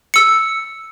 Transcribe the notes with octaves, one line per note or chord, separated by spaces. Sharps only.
E6 C#7